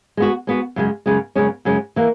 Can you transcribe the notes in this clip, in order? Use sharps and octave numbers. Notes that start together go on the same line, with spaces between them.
G#3 B3 F#4
G#3 B3 F#4
F#2 C#3 G#3
F#2 C#3 G#3
F#2 C#3 G#3 C#4
F#2 C#3 G#3 C#4
E3 A#3